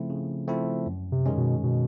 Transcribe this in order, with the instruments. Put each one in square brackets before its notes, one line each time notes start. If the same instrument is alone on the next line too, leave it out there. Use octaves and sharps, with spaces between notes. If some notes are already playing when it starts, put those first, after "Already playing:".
Already playing: [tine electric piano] C#3 F3 A3 C4 E4
C#3
F3 A3 C4 E4
F#2
[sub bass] C3
[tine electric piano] D#3 G#3 C#4
[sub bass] B2
B2